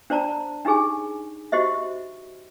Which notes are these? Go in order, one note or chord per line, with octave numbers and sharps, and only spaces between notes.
D4 C5 D5 A5 A#5
D4 D#4 G4 G#4 G#5
F#4 G4 C5 D#5 E5